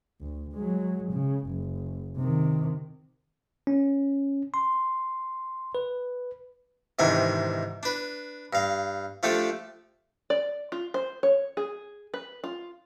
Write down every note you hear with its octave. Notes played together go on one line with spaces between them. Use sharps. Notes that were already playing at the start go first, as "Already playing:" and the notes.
D2
F#3 G#3
C#3
F#1
C3 D#3
C#4
C6
B4
G#2 C3 D#3 E3 D4 G#5
D4 B4
G2 F5
F3 A3 D4 G4 A4
D5
F4
C5
C#5
G#4
B4
F4